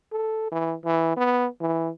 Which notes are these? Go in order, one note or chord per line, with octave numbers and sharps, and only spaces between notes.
A4
E3
E3
B3
E3